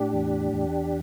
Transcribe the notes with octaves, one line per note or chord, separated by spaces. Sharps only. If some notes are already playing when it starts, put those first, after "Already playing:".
Already playing: A2 D4 G4
E2
E2